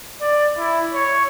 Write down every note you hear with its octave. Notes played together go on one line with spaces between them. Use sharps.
D5
E4
C#5